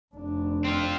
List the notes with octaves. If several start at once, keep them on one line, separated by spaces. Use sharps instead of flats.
F1 D4
C4 F4